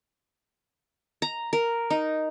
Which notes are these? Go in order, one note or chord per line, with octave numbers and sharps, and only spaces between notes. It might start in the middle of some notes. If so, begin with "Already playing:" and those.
A#5
A#4
D#4